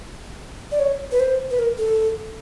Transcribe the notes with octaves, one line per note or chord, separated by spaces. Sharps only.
D5
C#5
B4
C5
B4
A#4
A4